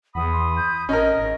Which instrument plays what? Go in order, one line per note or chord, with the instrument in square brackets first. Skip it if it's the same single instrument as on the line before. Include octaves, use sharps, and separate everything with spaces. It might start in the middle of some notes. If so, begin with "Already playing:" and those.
[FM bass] E2 [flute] F#5 [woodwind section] B5 D#6
[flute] C6
G6
[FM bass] A1 [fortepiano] C#4 A#4 [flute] D#5
[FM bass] G#1